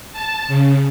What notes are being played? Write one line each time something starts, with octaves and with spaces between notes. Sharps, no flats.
A5
C#3